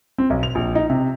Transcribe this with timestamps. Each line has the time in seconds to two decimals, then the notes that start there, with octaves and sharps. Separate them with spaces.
0.18 C4
0.30 B1
0.43 F7
0.55 A#1
0.75 D#4
0.90 C3